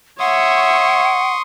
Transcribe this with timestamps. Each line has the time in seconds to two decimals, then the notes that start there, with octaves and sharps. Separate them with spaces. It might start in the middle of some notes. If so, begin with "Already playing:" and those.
0.20 C#5 E5 F#5 C6 C#6 D#6